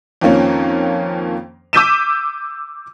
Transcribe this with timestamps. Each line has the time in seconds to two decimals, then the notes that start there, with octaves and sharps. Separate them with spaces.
0.21 F2 D#3 F3 A#3 C#4
1.73 D6 E6 G6 B6 D#7 E7